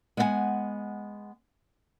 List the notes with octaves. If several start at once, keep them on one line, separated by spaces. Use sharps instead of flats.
G#3 B3 D#5 E5 F#5 G#5